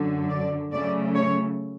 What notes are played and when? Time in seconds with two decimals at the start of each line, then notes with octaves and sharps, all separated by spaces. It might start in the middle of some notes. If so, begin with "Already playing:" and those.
Already playing: F#2 D3 F#3
0.30 D5
0.72 C#3 F#3 A3 D5
1.15 C#5